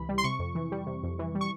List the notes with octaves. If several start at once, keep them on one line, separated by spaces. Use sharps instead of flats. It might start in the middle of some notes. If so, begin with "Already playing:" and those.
Already playing: C#2 C3 E3 B5
G3
C6
C3 C#6
F2
E3
G3
C3
F2
E3
G3
C#6